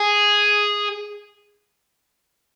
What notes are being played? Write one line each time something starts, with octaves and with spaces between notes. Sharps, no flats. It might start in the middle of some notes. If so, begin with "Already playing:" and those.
Already playing: G#4